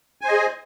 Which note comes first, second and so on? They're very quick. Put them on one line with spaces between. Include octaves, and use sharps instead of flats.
G#5 C5 D#5 G#4